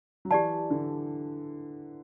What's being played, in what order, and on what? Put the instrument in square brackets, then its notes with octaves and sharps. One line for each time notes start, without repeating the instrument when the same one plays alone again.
[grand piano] F#3
[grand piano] E3 [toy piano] G4 D5 A5
[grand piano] D3